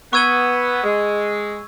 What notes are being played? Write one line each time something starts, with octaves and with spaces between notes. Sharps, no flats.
B3 C#6 E6 G#6 D#7 G7
G#3